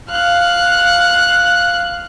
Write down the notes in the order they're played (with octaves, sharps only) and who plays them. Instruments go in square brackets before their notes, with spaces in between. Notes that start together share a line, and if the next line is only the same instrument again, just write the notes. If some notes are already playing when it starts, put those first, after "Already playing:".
[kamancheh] F5 F#6